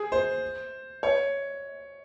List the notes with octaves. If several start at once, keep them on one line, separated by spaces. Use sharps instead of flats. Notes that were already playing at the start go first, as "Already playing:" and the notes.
Already playing: G#4
C5
C#5